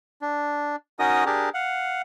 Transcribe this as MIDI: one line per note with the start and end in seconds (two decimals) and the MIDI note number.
0.22 0.76 62
0.99 1.24 61
0.99 1.24 63
0.99 1.24 66
0.99 1.24 70
0.99 1.24 75
0.99 1.24 87
1.26 1.49 62
1.26 1.49 67
1.26 1.49 68
1.26 1.49 70
1.54 2.02 77
1.54 2.02 78